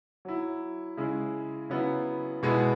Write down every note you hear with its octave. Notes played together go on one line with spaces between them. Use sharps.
F#3 E4
C#3 G#3 E4
C#3 F#3 B3 E4
B2 G#3 B3 E4